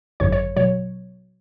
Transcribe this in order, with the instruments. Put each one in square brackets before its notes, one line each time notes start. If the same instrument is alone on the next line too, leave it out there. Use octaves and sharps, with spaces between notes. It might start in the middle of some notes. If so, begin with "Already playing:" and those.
[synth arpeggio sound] G#1 F#2 D3 F#3 C#5
C#5
B2 F#3 C#5